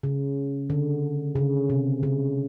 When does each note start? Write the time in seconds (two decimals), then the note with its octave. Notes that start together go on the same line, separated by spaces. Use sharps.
0.03 C#3
0.70 D3
1.36 C#3
1.70 C3
2.03 C#3